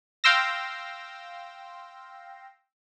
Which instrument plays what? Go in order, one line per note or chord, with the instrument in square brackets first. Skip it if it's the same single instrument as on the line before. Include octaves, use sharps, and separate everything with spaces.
[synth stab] F5 G5 C6 E6 A#6